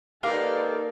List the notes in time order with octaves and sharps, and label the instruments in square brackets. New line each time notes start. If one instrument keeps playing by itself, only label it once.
[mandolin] A#3 F5 [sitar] B3 D#4 G4 [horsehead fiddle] A4 D5